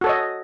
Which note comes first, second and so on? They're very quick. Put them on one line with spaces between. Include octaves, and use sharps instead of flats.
F#4 A4 C#5 D#5